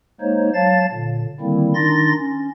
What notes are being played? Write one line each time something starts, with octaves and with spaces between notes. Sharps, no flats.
G#3 A#3 D#4 C5 C#5
F#3 C#5 F5 A5 A6
A#2 D3
D3 D#3 G3 A#3 C4 E4
D#3 D4 D#4 C6 A6 A#6
C#4